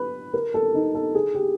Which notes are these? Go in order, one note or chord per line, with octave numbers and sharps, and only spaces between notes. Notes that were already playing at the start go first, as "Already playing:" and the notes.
Already playing: B4
A#4
A4
D#4
A4
G#4
G4